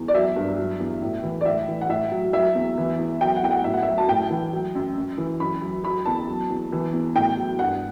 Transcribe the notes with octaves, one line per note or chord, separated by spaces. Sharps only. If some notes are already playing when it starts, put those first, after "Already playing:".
Already playing: E2
D5
F#3 E5
G2
F#3
E2
A2
E3
D5
A2 E5
E3
F#5
A2 E5
F#3
F#3 E5
E2
E3
E2
F#3 G5
F#5
E2 G5
F#5
A2 E5
F#5
F#3 E5
A5
A2 G5
E3
F#3
F#2
F#2
E3
F#2 B5
F#3
F#3 B5
E2 A5
F#3
E2
E3
E2
A2 G5
F#3
G2 F#5